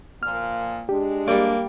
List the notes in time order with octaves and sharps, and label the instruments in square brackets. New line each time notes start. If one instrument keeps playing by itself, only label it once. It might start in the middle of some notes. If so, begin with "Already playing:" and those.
[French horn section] A#2 F3 A#3 [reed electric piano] F6
[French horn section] G#3 D4 [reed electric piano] G4
[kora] G3 D5 [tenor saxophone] A#3